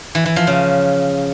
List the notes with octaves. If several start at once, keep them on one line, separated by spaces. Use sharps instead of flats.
E3
E3
F3
C#3